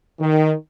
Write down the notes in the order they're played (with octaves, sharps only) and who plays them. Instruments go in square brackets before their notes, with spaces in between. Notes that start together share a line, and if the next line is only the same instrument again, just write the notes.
[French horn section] D#3